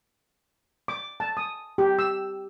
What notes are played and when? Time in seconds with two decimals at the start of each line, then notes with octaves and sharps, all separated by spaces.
0.88 D6
1.20 A5
1.37 D#6
1.78 G4
1.99 E6